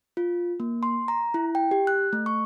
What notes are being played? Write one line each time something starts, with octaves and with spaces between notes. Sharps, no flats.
F4
A#3
C6
A#5
E4
G5
G4
F#6
A3
C#6